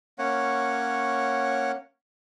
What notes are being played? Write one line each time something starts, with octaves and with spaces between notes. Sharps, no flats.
A#3 C#4 C#5 F#5